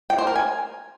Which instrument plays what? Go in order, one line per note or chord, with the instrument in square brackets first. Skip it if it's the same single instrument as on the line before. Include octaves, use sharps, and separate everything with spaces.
[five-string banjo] G5
C5
A#4
G#5